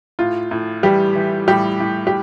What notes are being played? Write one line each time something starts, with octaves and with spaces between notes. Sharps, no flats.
A2 F4
A2
E3 G3 G4
E3
A2 G3 G4
A2
G4